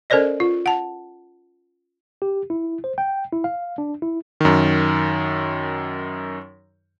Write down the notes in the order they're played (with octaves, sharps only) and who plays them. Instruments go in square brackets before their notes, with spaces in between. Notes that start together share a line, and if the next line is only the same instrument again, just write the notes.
[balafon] C#4 A4 A#4 C5 D5 D#5
F4
F#5 A5
[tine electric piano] G4
E4
C5
G5
E4
F5
D4
E4
[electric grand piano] F#2 D#3